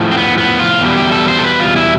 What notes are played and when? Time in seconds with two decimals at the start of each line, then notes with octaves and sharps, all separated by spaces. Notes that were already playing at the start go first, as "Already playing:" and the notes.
Already playing: A2 F3
0.12 C4
0.17 B3
0.38 B3
0.59 F4
0.80 E2 B2 G3
0.97 G4
1.12 A4
1.28 C5
1.39 A4
1.44 B4
1.60 F4
1.76 E4